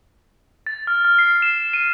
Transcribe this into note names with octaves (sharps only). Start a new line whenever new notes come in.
A6
F6
F6
C7
E7
D#7